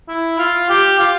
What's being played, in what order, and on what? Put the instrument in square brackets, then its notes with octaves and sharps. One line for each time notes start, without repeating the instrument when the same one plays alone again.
[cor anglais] E4
F4
G4
F4